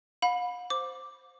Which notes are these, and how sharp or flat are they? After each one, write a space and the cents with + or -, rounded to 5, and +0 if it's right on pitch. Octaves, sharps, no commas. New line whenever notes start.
F5 +45 B5 +0
C5 +0 D6 +0